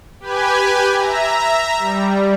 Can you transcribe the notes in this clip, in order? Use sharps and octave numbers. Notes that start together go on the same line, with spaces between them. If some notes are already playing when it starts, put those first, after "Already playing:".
G4 B4 G#5
E5 A#5
G3